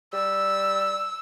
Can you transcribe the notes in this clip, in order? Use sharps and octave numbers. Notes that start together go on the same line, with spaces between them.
G3 E6